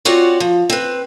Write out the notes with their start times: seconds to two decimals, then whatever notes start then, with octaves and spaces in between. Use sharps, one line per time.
0.05 C4 F4 F#4 C#5 D5 F#5
0.40 F3
0.70 C4 B4